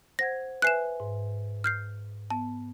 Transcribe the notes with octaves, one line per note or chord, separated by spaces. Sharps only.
C5 F#5 G#6 A#6
B4 E5 G#5 F#6 C7 E7
G#2
F6 G6 C7
B3 A5